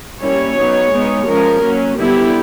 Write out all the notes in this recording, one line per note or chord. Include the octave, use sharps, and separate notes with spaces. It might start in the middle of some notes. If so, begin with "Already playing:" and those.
G3 A#3 C#4 E4 C#5
F#3 B3 D#4
G#3 B3 D#4
F3 G#3 C#4 A#4
F#3 A#3 C#4
D3 G3 B3 E4 G4